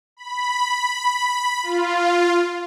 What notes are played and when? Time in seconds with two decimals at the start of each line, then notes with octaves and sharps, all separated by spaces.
0.17 B5
1.63 F4